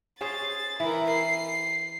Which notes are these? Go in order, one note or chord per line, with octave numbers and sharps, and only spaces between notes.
C#4 G#4 C5 A6
E3 E4 A#4
C7